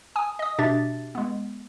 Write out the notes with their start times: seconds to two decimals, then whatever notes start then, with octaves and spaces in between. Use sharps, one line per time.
0.16 G#5 D#6
0.39 D#5 D#6
0.59 B2 D4 G4 E5 A6
1.15 G#3 B3